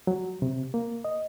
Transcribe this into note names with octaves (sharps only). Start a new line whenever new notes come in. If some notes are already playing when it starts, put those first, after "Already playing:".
F#3
C3
A#3
D#5